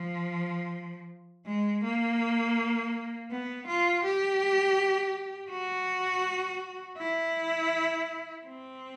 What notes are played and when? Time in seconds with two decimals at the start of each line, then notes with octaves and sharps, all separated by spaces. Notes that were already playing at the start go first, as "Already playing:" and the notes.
Already playing: F3
1.46 G#3
1.84 A#3
3.31 B3
3.67 F4
4.04 G4
5.51 F#4
6.98 E4
8.45 C4